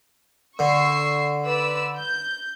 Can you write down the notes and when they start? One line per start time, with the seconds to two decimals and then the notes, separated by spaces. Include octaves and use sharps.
0.59 D3 C#6 E6 C7
1.45 B4 D5 E6
1.98 G6